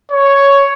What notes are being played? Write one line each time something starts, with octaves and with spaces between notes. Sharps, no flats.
C#5